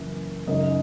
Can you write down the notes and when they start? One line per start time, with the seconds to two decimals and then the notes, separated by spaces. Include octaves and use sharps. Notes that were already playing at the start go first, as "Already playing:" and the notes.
Already playing: F#2 C#3 E3 A#3
0.47 F#2 C#3 G#3 D#4 D#5